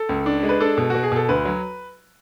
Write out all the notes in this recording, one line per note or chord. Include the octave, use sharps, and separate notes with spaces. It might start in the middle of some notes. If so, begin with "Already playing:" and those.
Already playing: A4
C#2
D4
G#3
B4
D4 A4
B2
B2 F#4
G#4
B2 A4
D2 B4
F#3